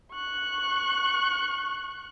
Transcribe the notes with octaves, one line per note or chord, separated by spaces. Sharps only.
C#6 F#6